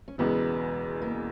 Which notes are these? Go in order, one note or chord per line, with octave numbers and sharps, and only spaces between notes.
C#4
E1 E2 C#3 G#3 B3
A#3